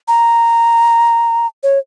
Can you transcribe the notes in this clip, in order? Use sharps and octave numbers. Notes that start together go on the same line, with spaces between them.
A#5
C#5